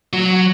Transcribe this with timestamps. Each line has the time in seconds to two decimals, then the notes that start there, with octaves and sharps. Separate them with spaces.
0.13 F#3